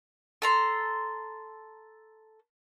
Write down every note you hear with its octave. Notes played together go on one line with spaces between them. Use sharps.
A4 A#5 C6